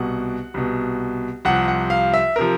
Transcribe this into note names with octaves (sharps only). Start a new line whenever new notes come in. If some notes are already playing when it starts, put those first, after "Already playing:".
Already playing: C2 B2 F#5
C2 B2
C2 C3 F3 F#5
F#5
F5
E5
C3 F3 A#4